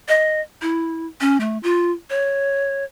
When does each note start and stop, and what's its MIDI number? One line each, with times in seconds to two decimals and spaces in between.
0.08 0.41 75
0.62 1.07 64
1.21 1.37 61
1.40 1.58 57
1.63 1.91 65
2.10 2.84 73